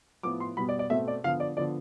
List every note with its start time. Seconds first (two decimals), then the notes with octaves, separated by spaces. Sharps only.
0.23 A2 F3 B3 D6
0.40 C6
0.57 B2 G3 B3 B5
0.69 D5
0.79 D5
0.90 B2 A3 C4 E5
1.08 D5
1.24 D3 F3 B3 F5
1.40 D5
1.57 D3 F3 B3 D5